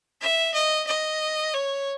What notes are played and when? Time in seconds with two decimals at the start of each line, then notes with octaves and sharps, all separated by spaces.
0.21 E5
0.54 D#5
0.87 D#5
1.53 C#5